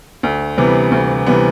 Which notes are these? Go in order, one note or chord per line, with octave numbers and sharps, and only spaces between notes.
D2
C3 E3 G3 B3
D2
C3 E3 G3 B3